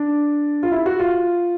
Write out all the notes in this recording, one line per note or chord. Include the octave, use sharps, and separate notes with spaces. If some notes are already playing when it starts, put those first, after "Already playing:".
Already playing: D4
F4
E4
F#4
F4